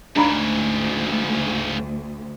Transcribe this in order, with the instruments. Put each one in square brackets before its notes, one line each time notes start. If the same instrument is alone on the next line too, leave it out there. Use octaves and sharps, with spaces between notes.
[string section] D2 [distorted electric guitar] G#2 C#3 [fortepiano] D4 A#5 B5